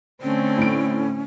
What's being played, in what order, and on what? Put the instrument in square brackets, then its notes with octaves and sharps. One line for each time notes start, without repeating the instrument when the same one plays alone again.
[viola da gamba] D3 A3 C4 [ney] C#4
[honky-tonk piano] A2 D7